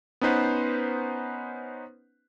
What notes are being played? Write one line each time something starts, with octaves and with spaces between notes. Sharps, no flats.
B3 C#4 D#4 B4 C5 F#5